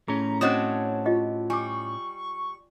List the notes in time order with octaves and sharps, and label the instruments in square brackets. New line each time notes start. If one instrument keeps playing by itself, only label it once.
[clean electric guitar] A2 C#4 [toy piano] G#4 [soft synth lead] A#5
[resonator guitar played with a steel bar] C4 D4 F#4 [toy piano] C5 D#5 D#6 [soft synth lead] C#5
[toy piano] F4 G4 D#5
[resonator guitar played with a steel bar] G3 [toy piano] G#5 D6 [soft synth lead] C#6